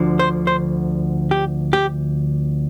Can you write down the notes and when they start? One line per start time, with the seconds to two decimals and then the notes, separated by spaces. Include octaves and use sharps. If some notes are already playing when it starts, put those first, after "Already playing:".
Already playing: D2 D3 F3
0.19 C5
0.47 C5
1.31 G4
1.73 G4